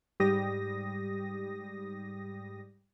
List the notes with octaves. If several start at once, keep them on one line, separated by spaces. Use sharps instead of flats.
G#2 G3 G4 D#6 A#6